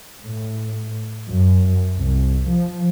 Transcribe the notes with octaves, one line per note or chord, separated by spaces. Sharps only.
A2
F#2
C2
F3